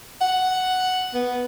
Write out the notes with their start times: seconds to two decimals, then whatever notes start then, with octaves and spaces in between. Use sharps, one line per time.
0.21 F#5
1.14 B3